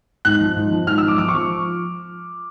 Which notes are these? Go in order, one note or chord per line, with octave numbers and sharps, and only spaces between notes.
G#2 F#6
F3
G#2
F3
G#2 F6
E6
F3
D6
F3 D6
C#6
F3